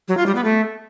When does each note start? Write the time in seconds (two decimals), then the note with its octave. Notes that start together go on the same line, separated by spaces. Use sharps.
0.08 F#3
0.17 F4
0.26 G3
0.35 B3
0.44 A3